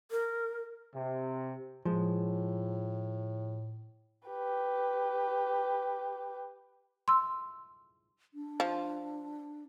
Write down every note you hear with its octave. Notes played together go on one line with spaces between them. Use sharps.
A#4
C3
A2 F3 G#3
G4 B4
C6 E6
D4
F3